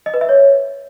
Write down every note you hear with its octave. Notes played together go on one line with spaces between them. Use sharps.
D#5
B4
E5
C#5